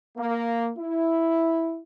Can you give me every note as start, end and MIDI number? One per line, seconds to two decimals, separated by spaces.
0.18 0.70 58
0.77 1.79 64